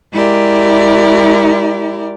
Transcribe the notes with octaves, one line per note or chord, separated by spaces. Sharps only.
G#3 E4 G4 A#4 D5